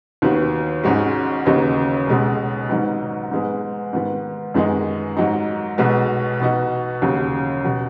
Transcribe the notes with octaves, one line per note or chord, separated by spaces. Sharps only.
D#2 D#3 B3 F#4
G#1 G#2 G#3 C#4 F#4
D#2 C#3 B3 D#4 F#4
B1 B2 G#3
G#1 G#2 F#3 B3 D#4
G#2 G#3 B3
G#2 D#3 B3
F#2 D#3 G#3 B3 D#4
G#2 F#3 D#4
B1 B2 G#3 B3 F#4
B2 B3 D#4 F#4
D#2 C#3 F#3
B2 F#3